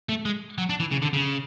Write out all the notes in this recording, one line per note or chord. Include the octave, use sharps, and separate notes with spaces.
A3
G#3
F#3
D4
E3
C#3
D3
C#3